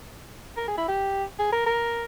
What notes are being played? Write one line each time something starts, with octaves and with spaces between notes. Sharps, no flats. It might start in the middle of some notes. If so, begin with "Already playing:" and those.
A#4
G#4
E4
G4
G#4
A#4
A#4